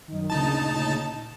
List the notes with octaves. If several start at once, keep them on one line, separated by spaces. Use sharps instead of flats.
F#2 D#3
D2 A#2 C#3 D#4 A5